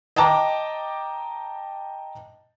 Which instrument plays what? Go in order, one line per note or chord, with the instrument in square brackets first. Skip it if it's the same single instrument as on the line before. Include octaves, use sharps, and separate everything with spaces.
[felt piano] D#5 G5 A5 A#5 D6